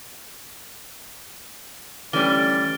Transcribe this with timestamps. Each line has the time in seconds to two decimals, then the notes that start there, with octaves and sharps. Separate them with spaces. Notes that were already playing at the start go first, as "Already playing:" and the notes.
2.13 D3 E3 G3 A3 C#4 D5 F6 G7